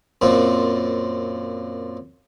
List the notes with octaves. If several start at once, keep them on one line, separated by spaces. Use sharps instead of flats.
F#2 A#2 C4